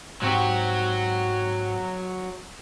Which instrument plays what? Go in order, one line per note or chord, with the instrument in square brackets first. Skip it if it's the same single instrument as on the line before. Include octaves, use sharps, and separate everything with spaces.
[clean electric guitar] G#2 C4 G4 [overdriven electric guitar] F#3 F#4